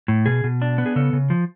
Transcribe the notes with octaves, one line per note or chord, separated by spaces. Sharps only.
A2
B2 G#4
B2
D4
B3
G#4
C#3 A4
C#3
F3